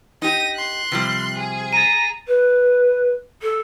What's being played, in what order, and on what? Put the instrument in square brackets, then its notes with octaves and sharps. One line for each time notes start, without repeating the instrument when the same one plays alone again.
[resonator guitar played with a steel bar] D#4 G4 [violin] A#6 D#7
[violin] C6 F#6
[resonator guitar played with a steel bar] C3 F3 G3
[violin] G#4
[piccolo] A#5 [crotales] A6 D#7
[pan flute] B4
A4